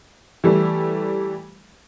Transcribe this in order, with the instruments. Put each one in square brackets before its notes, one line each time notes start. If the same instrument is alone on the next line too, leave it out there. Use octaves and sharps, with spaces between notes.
[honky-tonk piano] E3 G3 A3